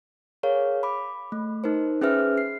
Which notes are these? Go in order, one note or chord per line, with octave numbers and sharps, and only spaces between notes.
G#4 A#4 C#5 F5
B5 D6
A3
D#4 A#4 C5
C#4 G#4 B4 C5 E5 F6
C7